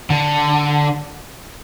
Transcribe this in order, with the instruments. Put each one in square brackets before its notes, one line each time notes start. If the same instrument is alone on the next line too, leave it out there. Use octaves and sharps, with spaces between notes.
[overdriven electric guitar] D3